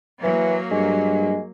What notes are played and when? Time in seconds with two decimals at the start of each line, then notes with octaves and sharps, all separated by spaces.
0.23 E3 F#3 A#3
0.71 G2 G#3